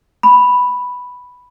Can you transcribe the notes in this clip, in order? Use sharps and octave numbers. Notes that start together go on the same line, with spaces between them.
B5